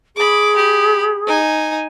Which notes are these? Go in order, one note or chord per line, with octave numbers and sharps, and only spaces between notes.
G#4 B5 D6
G4 B5
D#4 G#5